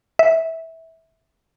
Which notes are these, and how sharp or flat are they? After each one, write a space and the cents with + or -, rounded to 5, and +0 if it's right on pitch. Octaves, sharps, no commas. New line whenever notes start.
E5 -20